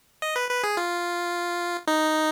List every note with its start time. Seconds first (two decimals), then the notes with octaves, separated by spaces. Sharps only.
0.22 D#5
0.36 B4
0.50 B4
0.64 G#4
0.77 F4
1.88 D#4